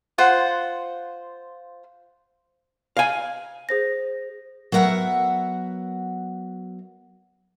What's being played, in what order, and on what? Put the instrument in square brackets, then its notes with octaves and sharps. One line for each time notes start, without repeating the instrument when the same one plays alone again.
[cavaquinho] F4 C5 F#5
[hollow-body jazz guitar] F5 G#5
[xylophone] G#4 C5 A#6
[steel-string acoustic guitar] F#3 B3 A#4 E5 F#5